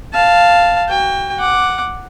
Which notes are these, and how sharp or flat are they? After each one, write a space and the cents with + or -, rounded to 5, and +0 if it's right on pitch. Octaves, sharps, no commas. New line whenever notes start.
F5 +0 A5 +0
F#4 +35 G5 +30
F#5 +0 D6 +0